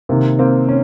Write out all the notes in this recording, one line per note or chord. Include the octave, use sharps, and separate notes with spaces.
C3 D#3 A#3
A#3 C4
C#4